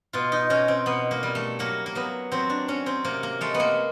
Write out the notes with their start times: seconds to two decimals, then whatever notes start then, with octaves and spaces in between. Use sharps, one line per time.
0.13 B2 F4
0.32 D#4
0.50 B2 C#4
0.68 C4
0.86 B2 B3
1.11 A#3
1.23 G3
1.35 A3
1.59 F#3 A#3
1.86 A#3
1.95 F#3 B3
2.32 F#3 C4
2.50 D4
2.68 F#3 C#4
2.86 C4
3.04 C3 A#3
3.23 A#3
3.41 G#3 A3
3.54 B3
3.60 A#3